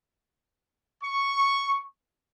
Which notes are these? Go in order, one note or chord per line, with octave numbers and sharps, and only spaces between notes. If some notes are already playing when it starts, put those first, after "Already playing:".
C#6